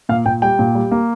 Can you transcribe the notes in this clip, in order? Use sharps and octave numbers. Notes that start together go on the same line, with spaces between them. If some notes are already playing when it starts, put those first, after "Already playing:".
A#2 F5
A#2 G5
G3 G5
A#2
G3
A#3